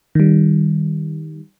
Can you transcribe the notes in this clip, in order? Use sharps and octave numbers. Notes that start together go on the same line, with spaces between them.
D#3 G3